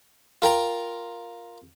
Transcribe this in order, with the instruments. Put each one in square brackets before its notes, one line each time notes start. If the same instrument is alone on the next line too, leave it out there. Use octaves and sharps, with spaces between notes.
[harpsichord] F4 A#4 G5 A#5